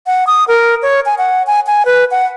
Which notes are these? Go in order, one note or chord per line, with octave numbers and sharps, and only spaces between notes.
F#5
D#6
A#4
C#5
G#5
F#5
G#5
G#5
B4
F#5